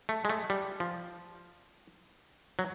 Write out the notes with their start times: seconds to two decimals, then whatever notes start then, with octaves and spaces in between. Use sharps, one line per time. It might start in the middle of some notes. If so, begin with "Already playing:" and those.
0.09 A3
0.25 G#3
0.29 A3
0.50 G3
0.80 F3
2.59 F#3